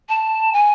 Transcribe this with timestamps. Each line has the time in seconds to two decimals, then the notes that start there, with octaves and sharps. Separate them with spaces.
0.09 A5
0.53 G#5